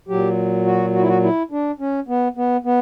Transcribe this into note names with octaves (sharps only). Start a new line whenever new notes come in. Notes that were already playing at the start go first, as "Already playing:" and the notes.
A#2 F#3 G4
F#4
F#4
E4
F#4
E4
D4
C#4
B3
B3
B3